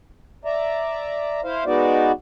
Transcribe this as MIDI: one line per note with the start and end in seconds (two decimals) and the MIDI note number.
0.45 1.41 74
0.45 1.41 76
0.45 1.41 82
1.44 1.64 64
1.44 1.64 72
1.44 1.64 77
1.66 2.12 56
1.66 2.12 59
1.66 2.12 63
1.66 2.12 66
1.66 2.12 74